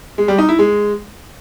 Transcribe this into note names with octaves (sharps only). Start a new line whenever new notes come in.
G#3
G3
D#4
E4
G#3